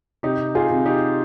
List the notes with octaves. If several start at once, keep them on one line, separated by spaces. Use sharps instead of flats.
C3 D#4 G4
F4 G#4
C3
D#4 G4